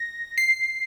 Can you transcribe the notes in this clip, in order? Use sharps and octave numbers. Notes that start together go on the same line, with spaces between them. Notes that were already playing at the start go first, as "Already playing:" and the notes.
Already playing: A#6
C7